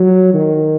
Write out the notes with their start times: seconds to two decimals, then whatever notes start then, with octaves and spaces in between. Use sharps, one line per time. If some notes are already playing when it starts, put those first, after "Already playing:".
Already playing: F#3
0.34 D#3